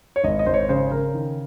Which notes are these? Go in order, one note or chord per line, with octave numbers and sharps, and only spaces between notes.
C#5
G#1 D#5
D#5
G#1 C5
C#5
C#3 C5
C#3 A#4
D#3